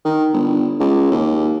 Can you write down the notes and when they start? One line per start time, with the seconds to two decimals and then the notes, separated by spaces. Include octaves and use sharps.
0.05 D#3
0.33 G1
0.80 C#2
1.11 D#2